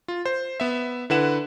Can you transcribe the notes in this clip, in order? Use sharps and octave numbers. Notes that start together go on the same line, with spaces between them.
F4
C5
B3 E5
D3 E4 B4 F#5 E7